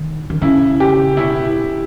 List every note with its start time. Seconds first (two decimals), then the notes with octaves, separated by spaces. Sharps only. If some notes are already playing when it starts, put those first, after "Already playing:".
Already playing: D#3
0.30 D#3
0.42 C#3 E4
0.80 G4
1.17 B2 E4